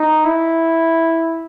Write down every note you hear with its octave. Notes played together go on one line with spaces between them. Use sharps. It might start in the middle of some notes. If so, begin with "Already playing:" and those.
Already playing: D#4
E4